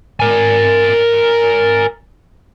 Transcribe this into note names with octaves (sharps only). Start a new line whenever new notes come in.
A#4 G#5